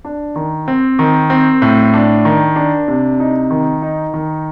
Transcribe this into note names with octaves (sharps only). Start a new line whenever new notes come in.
D4
D#3
C4
D#3
C4
A2
D4
D#3
D4
C3
D#4
D#3
D#4
D#3